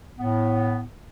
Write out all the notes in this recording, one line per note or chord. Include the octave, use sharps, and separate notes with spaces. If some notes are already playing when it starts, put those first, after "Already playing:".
A2 B3